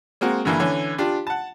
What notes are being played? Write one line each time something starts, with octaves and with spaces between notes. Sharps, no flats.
G#3 A#3 C4 F#4
G2 D3 E3 A#3 E4
D3 E3 C#4
D4 F4 G4
F#5 A5